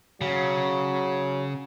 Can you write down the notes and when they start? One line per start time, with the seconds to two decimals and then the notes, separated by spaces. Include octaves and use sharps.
0.21 C#3 F#3